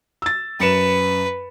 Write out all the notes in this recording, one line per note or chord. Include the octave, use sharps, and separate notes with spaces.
E6 A6
F#2 B4 C#7 E7